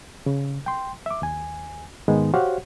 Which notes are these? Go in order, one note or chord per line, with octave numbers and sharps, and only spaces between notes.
C#3
G5 C6
E5 D6
D#2 G#5
G#2 D#3 G#3 B3 D#4
F#4 G4 C5 C#5 F5 F#5